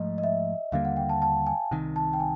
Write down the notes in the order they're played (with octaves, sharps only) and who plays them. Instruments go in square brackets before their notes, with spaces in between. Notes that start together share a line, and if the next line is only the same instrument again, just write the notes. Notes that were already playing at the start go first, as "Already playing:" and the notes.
Already playing: [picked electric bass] G#2 F3 A3 [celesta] D#5
[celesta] D#5
E5
[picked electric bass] D#2 D3 G3 A#3 [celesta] F5
[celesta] F#5
G5
A5
A5
G#5
[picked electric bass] C2 C3 D#3
[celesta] A5
G5
G#5